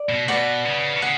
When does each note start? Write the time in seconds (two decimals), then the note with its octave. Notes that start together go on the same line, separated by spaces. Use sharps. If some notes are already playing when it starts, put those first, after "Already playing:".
Already playing: D5
0.09 B2
0.28 B2 B4 D5 F#5
0.65 C#3
0.96 D3
1.02 C#3 F#5